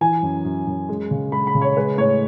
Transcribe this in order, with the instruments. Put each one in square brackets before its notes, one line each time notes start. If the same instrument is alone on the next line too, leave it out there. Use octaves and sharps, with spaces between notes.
[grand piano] E3 G#5
F#2
F#2
F#2
G#3
C#3
G#3 B5
B5
C#3
C#5
G#3 B4
A2 C#5